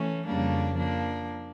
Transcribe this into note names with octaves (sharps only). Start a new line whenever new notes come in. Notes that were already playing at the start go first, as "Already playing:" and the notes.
Already playing: E3 A3 C#4
F2 C#3 G3 A#3 D4
F3 A#3 D4